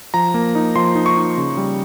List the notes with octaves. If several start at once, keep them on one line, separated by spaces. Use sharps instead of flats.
F3 A#5
A#3
D#4
F3 C6
D#4
C#6
D#4
C#3
G3